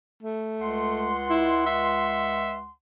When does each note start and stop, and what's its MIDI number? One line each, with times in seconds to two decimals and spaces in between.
0.23 1.13 57
0.61 2.71 37
0.61 2.71 78
0.61 2.71 84
1.30 1.63 64
1.66 2.55 76